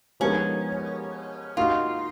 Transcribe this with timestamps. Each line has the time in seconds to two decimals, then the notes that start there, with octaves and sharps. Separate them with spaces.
0.20 F3 G#3 B3 C#4 D#4 A#4
1.57 A#3 D#4 F4 F#4